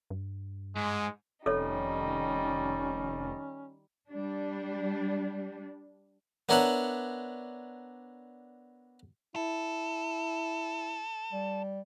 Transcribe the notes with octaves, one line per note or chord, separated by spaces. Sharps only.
G2
G#2 G#3
F1 D#3 G3 C#4 D#4 A4 C#5
G3 D4
B3 D4 A#4 C#5 E5 F#5
E4 A4
G3